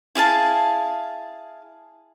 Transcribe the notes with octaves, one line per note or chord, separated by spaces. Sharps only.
E4 G#4 F5 A5